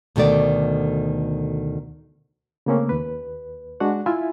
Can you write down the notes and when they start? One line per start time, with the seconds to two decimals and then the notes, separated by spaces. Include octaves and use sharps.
0.16 D2 B2 D#3 A3 D5
2.66 C#3 A3 A#3 C4 C#4
2.89 D#2 B4
3.80 G#3 D4 F#4 F#5
4.06 E4 F4 E5 G#5